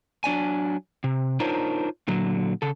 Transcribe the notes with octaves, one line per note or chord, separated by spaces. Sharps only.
F#3 D4 D5 G#5
C3
D4 D#4 F4 A#4 C5 C#5
A#2 D3 F#3
C#3 A4